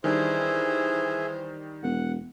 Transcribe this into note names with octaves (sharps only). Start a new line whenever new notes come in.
D#3 E3 G3 D4 G#4 C5 E5
E1 F#5